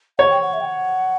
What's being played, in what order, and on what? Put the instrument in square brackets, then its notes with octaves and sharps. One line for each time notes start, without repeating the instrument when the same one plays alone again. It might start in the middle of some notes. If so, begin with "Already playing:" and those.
[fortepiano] C#5 [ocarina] F#5
[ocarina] G5
F#5
E5
G5
F#5